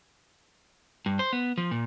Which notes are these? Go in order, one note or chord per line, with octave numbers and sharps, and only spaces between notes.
G2
C5
B3
F3
A#2